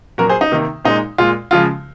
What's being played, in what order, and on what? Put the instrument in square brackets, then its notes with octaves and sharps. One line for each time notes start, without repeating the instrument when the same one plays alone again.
[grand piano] A#2 F#3 A#3 F#4 A#4
G#4 C5
D#4
C3 D#3 A#3
A#2 G#3 D#4
A#2 G#3 F4
C#3 F3 G#3 F4